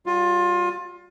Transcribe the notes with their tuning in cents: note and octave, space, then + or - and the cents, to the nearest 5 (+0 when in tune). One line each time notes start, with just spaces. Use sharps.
G3 -30 F4 +25